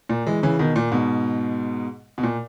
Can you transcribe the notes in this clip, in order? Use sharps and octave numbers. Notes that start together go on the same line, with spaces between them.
A#2
E3 G#3
C#3 E3
B2 D#3
A#2
G#2 B2
B2
A#2